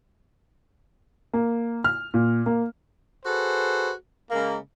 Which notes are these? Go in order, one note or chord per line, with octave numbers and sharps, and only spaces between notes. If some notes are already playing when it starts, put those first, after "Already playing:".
A#3
F6
A#2
A#3
F#4 G#4 A4 B4 C5
C#3 G#3 A#3